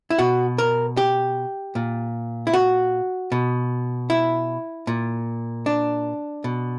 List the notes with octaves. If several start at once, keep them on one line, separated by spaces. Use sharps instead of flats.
E4
B2 F#4
A#4
G4
A#2
E4
F#4
B2
E4
A#2
D4
B2